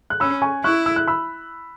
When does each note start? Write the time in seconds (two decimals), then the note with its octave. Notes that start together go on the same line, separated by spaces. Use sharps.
0.10 F#6
0.20 C#4 B5 E6
0.42 G#5 C#6
0.64 E4 C#6 F#6
0.86 E6
0.96 F#6
1.07 B5 E6